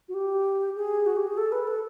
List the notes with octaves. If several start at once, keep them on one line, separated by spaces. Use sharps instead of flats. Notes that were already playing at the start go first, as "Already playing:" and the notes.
F#4
G4
G#4
F#4
G4
G#4
A4
B4
A4